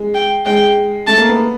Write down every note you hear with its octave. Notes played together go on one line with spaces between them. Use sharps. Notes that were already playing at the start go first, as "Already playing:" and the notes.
Already playing: G#3
G5
G#3 G5
A3 A5
A#3
B3